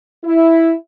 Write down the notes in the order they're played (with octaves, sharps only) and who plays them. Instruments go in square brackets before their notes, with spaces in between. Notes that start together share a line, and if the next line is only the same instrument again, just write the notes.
[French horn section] E4